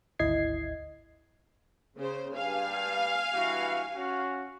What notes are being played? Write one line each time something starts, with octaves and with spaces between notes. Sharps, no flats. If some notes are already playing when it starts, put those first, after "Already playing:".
G#1 D2 E4 D#5 G#6 C7
C#3 C5
G2 F5 G#5
G2 E3 F#4
C#4 F#4